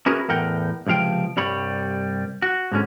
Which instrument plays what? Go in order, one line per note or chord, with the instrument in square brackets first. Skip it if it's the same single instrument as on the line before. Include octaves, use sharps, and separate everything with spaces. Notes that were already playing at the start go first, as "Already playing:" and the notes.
[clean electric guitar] C#4 E4 F#4 G#4 A#4 B4
E2 A2 A#4 F#5 G5
C#2 C3 F3 F5 G5
C2 G2 G3 C#5 B5
F#4
G#2 D3 C#4